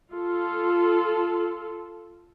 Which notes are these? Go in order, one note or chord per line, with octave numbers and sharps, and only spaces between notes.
F4 A4